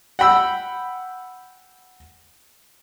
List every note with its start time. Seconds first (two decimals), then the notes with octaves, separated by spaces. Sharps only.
0.19 F#5 G5 B5 E6